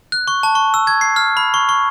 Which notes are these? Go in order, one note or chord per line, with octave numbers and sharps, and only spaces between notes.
F#6
C#6
A5
C#6
E6
G#6
C7
F6
B5
C#6
C#6